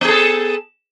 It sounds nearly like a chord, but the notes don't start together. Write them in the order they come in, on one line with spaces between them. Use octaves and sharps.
B3 G#4 A4